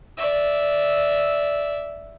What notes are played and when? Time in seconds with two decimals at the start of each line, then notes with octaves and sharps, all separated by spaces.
0.17 D5 E5